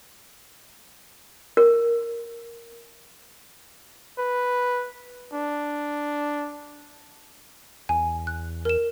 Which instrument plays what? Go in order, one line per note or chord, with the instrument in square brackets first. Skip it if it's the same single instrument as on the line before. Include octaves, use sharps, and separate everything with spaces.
[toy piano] A#4
[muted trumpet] B4
D4
[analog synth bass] E2 [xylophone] G#5
[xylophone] F#6
A#4 E7